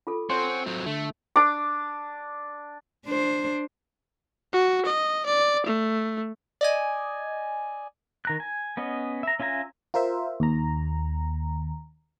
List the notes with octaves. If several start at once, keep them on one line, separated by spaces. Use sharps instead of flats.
F4 G#4 A4
C4 A4 C#5 F#5 G#5 C6 C#6
F#3 C4
D3 A3
D4 D6
D4 C5
F#4
D#5
D5
A3
D5 D#5 G#5
D#3 A#5 F#6
G#5
B3 C#4 D#5
E5 A#5
C#4 F4 E5 G#5 A#5
F4 A#4 C5 E5
D#2 A#5